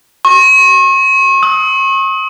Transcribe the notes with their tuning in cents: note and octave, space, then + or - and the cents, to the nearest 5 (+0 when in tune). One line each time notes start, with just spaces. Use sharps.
C#6 -40
D#6 +35